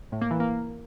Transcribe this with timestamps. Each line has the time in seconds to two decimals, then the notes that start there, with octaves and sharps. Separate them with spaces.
0.12 A2
0.21 A#3
0.31 E3
0.40 A#3